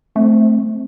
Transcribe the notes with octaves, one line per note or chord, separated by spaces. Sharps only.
A3 C4